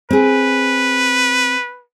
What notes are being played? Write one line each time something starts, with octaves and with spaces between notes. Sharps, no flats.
C4 G#4 B4